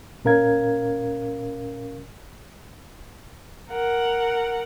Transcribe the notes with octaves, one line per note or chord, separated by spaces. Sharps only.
A#2 C#4 A#4 F5 G#6
A#4 F#5